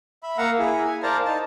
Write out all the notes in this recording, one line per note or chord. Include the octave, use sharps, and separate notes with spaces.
E5 B5
A#3 F5 F#5 A#5 E6
E4 G#4
G#5
A#4 C5 D5 F5 A5 A#5
D#4 A5